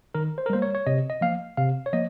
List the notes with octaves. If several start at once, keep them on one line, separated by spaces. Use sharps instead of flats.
D#3 A#4
C5
A#4
G3 A#3 C5
C#5
C#5
C3 D#5
D#5
F3 A#3 F5
C3 F5
C#5
F3 A#3 D#5